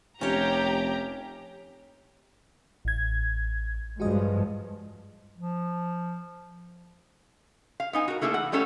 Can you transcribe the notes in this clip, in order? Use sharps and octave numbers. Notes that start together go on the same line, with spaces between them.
F1 C#4 G4 C#5 A#5
A1 G#6
G2 F3 G#3 F#4 G#4 D#5
F3
F5
B3 D#4 G#5
F#4 A#4
A3 A#3 E4 G#4 A4
E3 F#5
G3 A3 C#4 A4 C#5